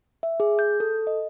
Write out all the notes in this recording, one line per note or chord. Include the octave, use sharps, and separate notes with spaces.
E5
G#4
G6
A4
D#5